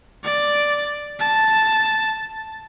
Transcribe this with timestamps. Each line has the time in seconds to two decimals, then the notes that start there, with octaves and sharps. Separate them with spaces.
0.24 D5
1.19 A5